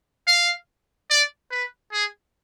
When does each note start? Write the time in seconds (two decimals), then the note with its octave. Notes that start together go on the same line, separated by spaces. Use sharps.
0.27 F5
1.10 D5
1.51 B4
1.92 G#4